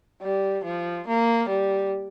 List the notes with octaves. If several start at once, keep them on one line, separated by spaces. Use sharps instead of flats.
G3
F3
A#3
G3